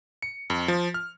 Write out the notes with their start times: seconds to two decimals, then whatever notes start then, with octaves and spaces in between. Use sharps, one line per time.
0.22 C#7
0.50 F2
0.68 F3
0.94 F6